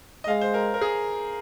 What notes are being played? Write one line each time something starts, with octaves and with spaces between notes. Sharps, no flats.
D#5
G#3 F5
C5
A#4
A#4
G#4